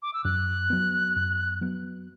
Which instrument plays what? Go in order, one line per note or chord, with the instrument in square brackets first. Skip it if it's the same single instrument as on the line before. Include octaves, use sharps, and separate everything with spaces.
[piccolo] D6
E6
[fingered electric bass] F#2 [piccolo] F#6
[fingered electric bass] F#3 B3
F#2
F#3 B3